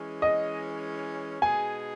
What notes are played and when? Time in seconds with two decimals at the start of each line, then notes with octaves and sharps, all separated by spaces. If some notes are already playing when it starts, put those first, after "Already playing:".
Already playing: E3 G#3 C#4
0.22 D#5
1.42 B2 G#3 D#4 G#4 G#5